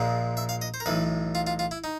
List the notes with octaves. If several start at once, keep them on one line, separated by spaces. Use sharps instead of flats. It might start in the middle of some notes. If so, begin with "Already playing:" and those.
Already playing: A#1 A#2 F3 G#3
E5
F5
D#5
C5
A#4
B1 A2 E3 B4
F4
F4
F4
E4
D#4